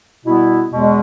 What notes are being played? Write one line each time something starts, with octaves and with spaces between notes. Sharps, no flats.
B2 G3 B3 E4
E2 B2 G#3